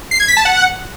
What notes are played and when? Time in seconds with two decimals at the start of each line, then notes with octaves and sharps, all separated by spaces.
0.11 C7
0.20 G#6
0.28 B6
0.37 A5
0.45 F#5